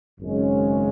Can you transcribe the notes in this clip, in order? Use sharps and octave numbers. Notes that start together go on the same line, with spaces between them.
G#1 F#2 C#3 G#3 C#4